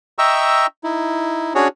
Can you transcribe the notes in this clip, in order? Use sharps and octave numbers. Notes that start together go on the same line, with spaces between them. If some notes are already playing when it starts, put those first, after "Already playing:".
D#5 E5 G5 A#5 C#6 E6
D#4 E4
C#4 D4 F#4 G#4 C#5